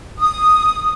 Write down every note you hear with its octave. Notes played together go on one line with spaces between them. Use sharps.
D#6